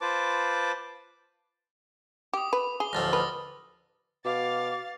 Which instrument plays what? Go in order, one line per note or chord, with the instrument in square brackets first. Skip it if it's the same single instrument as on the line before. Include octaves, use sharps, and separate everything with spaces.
[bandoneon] F4 B4 C5 A5 D6
[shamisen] G4 [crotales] D6 D#6
[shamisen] B4
[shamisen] G#4 [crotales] G7
[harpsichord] A1 D2 F3 [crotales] E6 A6 A#6
[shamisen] B4 [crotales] D#6
[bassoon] B2 [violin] F5 A6 [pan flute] D6